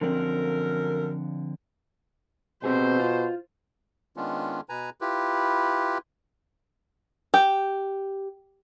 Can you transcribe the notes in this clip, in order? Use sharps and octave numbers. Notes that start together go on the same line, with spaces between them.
F#2 D3 F3 C4 A4 A#4
B2 C4 G4 G#4 C5
F4
D#3 G#3 B3 C#4 D4 F4
B2 B4 G#5 A#5
E4 F4 G4 B4
G4